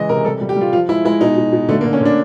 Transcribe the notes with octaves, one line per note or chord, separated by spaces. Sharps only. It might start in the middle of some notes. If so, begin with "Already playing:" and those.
Already playing: C#3 E3 G#3 D#5
C3 A#4
G3 A4
G3
G4
G3 F4
F3 F4
G#3 E4
G#3 E4
B2 D#4
B2
B2
D3 A3
A#3
D3
C#4
D3 D4